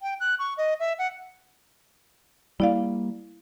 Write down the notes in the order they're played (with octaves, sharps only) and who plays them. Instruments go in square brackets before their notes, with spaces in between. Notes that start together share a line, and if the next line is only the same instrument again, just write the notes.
[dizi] G5
F#6
C#6
D#5
E5
F#5
[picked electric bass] G3 A#3 [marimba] E4 D5 F5